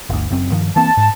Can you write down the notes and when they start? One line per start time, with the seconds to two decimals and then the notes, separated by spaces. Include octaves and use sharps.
0.10 G1 D2
0.31 F#1 F#2 C4
0.52 G2 D#3 F3
0.76 E3 A#3 C4 A5
0.97 G#2